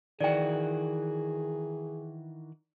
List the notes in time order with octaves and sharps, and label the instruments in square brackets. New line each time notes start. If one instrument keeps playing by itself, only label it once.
[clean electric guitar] D#3 E3 F#4 [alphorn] G#4 [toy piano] D5 G5